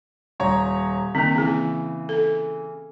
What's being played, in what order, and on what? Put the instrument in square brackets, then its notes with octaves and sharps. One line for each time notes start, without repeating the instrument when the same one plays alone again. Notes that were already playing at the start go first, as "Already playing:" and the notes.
[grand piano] D#1 C#5 A#5
[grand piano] D#3 [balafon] A#3 C4
[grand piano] C#3 E3 [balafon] C4 G#4
[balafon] A4